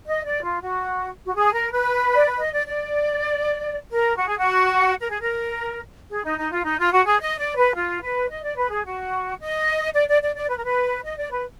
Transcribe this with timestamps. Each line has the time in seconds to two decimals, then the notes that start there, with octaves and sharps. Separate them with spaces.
0.06 D#5
0.25 D5
0.43 F4
0.61 F#4
1.26 F#4
1.35 G#4
1.53 A#4
1.71 B4
2.15 D5
2.26 B4
2.39 D#5
2.53 D5
2.67 D5
3.91 A#4
4.17 F#4
4.28 G#4
4.38 F#4
5.00 A#4
5.10 G#4
5.21 A#4
6.10 G#4
6.24 D#4
6.38 D#4
6.51 F4
6.64 D#4
6.79 F4
6.92 F#4
7.06 G#4
7.20 D#5
7.38 D5
7.57 B4
7.75 F4
8.02 B4
8.30 D#5
8.43 D5
8.57 B4
8.70 G#4
8.85 F#4
9.40 D#5
9.94 D5
10.08 D5
10.22 D5
10.35 D5
10.49 B4
10.57 A#4
10.65 B4
11.04 D#5
11.17 D5
11.31 B4